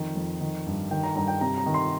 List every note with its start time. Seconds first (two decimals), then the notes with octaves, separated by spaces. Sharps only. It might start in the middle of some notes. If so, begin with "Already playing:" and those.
Already playing: F2 D#3
0.16 F2
0.41 D#3
0.66 G2
0.91 D#3 G5
1.03 A#5
1.16 G2 A#5
1.28 G5
1.41 C3 A#5
1.58 A#5
1.66 D#3
1.74 C6